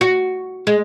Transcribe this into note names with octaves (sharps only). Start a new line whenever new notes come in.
F#4
G#3